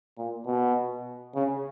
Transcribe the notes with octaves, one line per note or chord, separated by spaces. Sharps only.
A#2
B2
C#3